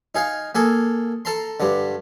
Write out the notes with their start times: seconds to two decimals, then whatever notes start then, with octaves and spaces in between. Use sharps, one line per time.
0.15 D#4 G#4 F5
0.55 A#3 G#4 A4
1.25 A4 A5 A#5 C6
1.60 G2 D3